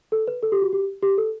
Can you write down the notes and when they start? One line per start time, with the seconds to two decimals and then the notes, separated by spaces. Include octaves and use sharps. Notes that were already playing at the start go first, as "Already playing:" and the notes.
0.12 A4
0.28 B4
0.43 A4
0.52 G4
0.62 F#4
0.73 G4
1.03 G4
1.18 A4